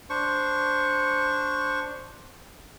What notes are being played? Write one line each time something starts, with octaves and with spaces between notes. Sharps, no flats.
D4 C5 C#6